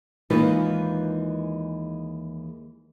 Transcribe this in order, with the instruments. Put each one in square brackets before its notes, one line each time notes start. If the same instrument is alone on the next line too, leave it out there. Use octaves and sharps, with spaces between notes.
[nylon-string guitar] D#2 E3 G#3 D#4 F4 B4